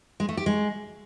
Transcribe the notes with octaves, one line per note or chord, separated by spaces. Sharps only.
G#3
A3
G4
G#3